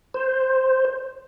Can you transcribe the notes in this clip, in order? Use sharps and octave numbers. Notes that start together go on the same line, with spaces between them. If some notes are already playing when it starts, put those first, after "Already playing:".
C5